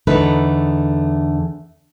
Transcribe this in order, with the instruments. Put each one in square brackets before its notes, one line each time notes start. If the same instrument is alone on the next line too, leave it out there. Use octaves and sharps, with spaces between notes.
[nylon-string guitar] E2 D3 A3 D#4 B4